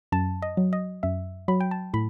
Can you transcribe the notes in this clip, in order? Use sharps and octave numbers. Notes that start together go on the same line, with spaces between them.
F#2 A5
D#5
F#3
D#5
F#2 E5
F#3 B5
G5
A5
A2 B5